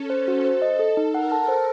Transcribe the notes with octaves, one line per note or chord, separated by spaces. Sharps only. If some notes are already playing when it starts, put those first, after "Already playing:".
Already playing: C#4 A4
C5
F#4
C5
D#5
A4
D#4
A#4 F#5
A5
C5